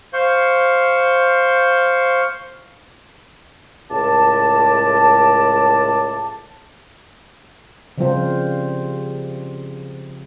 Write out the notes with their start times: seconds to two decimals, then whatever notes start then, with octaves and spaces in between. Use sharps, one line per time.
0.13 C5 F5 C#6 G6
3.90 C#2 A2 A#4 D5 A5
7.98 C#3 F3 G3 C4 F4 C5